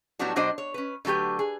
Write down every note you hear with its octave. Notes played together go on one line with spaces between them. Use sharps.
A2 F#3 G3 B3 D4 F#4
B2 F#3 D4 C5 D5 D#5
C#5
C#4 B4
D3 F#3 A3 G4 B4
G#4